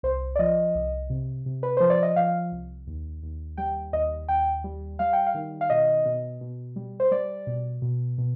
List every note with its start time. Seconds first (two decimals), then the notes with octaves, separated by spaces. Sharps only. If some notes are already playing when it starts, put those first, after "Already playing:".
0.03 C2 C5
0.36 D5
0.39 F3 D#5
0.75 C2
1.10 C3
1.46 C3
1.63 B4
1.77 F3 C5
1.90 D5
2.03 D#5
2.16 F3 F5
2.52 C2
2.87 D#2
3.23 D#2
3.57 G3 G5
3.93 D#2 D#5
4.28 D#2 G5
4.64 G3
4.99 G3 F5
5.13 G5
5.27 F5
5.34 D#3
5.61 F5
5.70 B2 D#5
6.06 B2
6.41 B2
6.76 G3
7.00 C5
7.11 G3 D5
7.47 B2
7.82 B2
8.18 B2